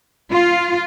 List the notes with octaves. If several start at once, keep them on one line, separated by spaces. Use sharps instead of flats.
F4